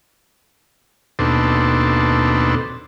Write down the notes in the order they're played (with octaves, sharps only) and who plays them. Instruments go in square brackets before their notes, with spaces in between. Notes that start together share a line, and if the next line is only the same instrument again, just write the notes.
[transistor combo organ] D#2 B2 C4 D4 A4